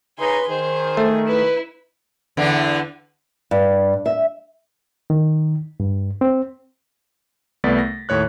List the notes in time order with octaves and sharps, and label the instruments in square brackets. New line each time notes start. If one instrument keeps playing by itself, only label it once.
[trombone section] C#3 D#4 [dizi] B4 [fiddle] G#5 C6
[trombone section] D#3 [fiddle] G#4 [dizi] C5
[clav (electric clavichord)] A3
[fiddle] E4 [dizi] B4
[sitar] E2 D3 E3
[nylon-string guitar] G2
E5
[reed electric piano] D#3
G2
C4
[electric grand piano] C2 A3 B3 D5 A6 B6
A#6
D#2 A2 C#5 F#6